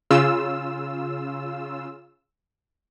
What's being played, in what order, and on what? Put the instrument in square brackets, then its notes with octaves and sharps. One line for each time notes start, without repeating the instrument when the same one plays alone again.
[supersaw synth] C#3 F4 E6